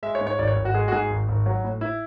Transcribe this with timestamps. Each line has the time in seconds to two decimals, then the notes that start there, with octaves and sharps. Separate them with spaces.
0.03 G#3 E5
0.15 C#5
0.21 G#2
0.27 C#5
0.39 G#1 D5
0.47 C#5
0.56 G#1
0.65 F#4
0.74 G#3 G#4
0.88 F#4
0.92 G#2 G#4
1.10 G#1
1.28 G#1
1.46 F#3
1.64 A2
1.81 E4